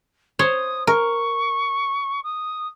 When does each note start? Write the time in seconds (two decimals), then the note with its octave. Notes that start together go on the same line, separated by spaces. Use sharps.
0.39 C5 C#5 D#6
0.87 A#4 C#6
2.24 D#6